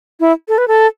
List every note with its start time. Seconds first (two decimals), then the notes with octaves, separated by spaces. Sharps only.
0.20 E4
0.48 A4
0.58 B4
0.68 A4